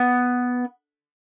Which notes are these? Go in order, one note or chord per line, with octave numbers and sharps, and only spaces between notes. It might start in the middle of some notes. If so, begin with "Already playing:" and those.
Already playing: B3